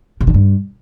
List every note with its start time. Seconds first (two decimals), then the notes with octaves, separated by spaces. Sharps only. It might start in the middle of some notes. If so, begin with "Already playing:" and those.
0.21 C3
0.27 D3
0.34 G2